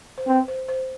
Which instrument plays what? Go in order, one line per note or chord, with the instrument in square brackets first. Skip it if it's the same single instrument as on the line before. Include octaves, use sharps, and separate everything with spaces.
[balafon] C5
[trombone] C4 [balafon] B4
[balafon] C5
C5